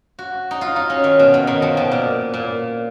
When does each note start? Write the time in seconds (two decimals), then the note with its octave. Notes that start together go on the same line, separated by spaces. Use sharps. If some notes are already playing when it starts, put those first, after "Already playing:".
0.19 F#4
0.51 D#4
0.61 F4
0.76 D#4
0.90 C#4
1.04 D#3
1.19 B2
1.34 B2
1.47 D#3
1.62 F3
1.77 B2
1.91 A#2
2.33 A#2